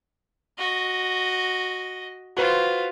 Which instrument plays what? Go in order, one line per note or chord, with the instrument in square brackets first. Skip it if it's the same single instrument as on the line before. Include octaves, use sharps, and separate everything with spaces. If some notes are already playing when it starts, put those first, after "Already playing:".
[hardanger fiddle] F#4 D#5
[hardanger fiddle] F4 [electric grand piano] F#4 B4 C5